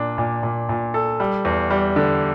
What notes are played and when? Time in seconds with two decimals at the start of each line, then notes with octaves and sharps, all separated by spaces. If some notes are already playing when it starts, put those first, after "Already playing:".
Already playing: A#2 D4
0.18 A#2
0.43 A#2
0.69 A#2
0.94 A4
1.20 G3
1.45 E2
1.70 G3
1.96 D3